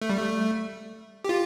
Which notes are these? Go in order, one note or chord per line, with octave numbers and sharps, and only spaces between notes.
A3
G3
A3
G4
F4